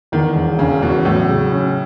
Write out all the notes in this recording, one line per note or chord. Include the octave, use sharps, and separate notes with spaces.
E2 D#3
E1
E1 C#3
E2 B2
A2 F#3
C#3
C#4